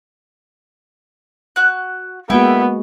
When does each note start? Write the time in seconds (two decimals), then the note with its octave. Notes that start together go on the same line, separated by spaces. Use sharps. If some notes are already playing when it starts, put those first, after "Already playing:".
1.56 F#4 F#6
2.30 G#3 A#3 B3 E4 F#4 E5 G5